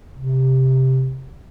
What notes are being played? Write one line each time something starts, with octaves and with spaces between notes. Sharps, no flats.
C3